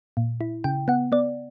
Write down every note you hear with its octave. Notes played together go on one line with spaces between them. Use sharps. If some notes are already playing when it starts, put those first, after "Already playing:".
A#2
E4
C#3 G5
B3 F#5
B3 D5